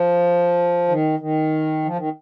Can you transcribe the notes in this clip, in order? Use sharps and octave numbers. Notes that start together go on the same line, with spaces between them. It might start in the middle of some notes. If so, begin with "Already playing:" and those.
Already playing: F3
D#3
D#3
F3
D#3